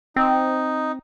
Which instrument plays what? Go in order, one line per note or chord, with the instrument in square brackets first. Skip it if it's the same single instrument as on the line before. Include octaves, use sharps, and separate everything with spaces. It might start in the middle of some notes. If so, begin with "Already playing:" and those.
[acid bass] C4 [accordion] D#4